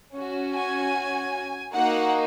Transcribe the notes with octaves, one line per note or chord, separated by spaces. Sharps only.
C#4 F#4
G#5
A#3 D#4 F#4 F#5